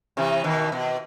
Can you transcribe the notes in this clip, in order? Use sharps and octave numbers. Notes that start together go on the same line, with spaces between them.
C3 E3
B2 D#3
B2